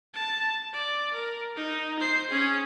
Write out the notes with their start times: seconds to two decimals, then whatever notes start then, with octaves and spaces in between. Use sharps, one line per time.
0.14 A5
0.73 D5
1.14 A#4
1.56 D#4
2.00 C5 C7
2.30 C#4 G#4